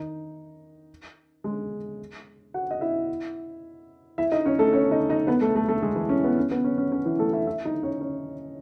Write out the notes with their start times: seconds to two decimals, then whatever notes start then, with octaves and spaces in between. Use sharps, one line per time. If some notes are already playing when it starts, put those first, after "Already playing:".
Already playing: D#3 D#4
1.44 G#3 G#4
2.54 F#4 F#5
2.71 D#5
2.81 E4 E5
4.18 E4 E5
4.32 D#4 D#5
4.45 C#4 C#5
4.59 A3 A4
4.73 C#4 C#5
4.91 D#4 D#5
5.10 D#4 D#5
5.27 B3 B4
5.41 A3 A4
5.55 A3 A4
5.68 A3 A4
5.83 G#3 G#4
5.96 E3 E4
6.09 C#4
6.24 B3
6.38 C#4
6.51 B3
6.64 C#4
6.78 C#4
6.92 C#4
7.05 E3 E4
7.19 A3 A4
7.33 E4 E5
7.46 E4 E5
7.65 D#4 D#5
7.83 C#4 C#5
8.01 C#4 C#5